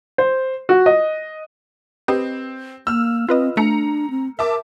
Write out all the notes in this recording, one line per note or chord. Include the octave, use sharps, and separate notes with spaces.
C5
F#4
D#5
C4 G4 B4 D#5
A#3 E6 F6
C4 F4 B4 D#5
A3 D4 A#5 C#7
C4
A#4 E5 A5 D6